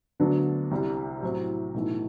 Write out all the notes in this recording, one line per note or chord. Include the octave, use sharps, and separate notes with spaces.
D2 D3 F#3 B3 D4
C2 C3 G3
A2 F#3 C4 E4
B1 A2 E3 A3